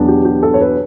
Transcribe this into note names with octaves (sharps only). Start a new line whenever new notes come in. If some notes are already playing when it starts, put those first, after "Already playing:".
Already playing: E2 B2 F#3 B3 D4
G4
G4
A4
C#5
B4